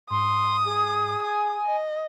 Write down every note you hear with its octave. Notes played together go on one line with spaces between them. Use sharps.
G#2 C6 D#6
G#4
G#5 D#6
D#5